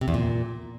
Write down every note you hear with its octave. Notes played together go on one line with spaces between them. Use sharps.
C3
E2
A#2